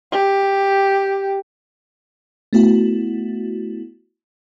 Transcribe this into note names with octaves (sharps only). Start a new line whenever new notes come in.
G4
A3 B3 E4 F#4